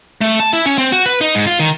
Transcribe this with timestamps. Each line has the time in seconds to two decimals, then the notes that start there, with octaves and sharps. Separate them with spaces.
0.21 A3
0.40 A5
0.53 E4
0.66 C#4
0.78 C4
0.92 F#4
1.06 B4
1.21 D#4
1.35 G#2
1.47 F4
1.60 D#3